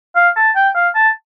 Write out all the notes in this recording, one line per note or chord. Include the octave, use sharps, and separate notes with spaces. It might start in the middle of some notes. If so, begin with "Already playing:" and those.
F5
A5
G5
F5
A5